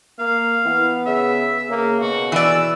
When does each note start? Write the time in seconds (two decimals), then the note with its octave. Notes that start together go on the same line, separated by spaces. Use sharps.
0.19 A#3 F5
0.65 E3 B3
1.06 C#3 E5
1.69 C#3 A#3
2.01 B2 F#4
2.32 E3 D5 E6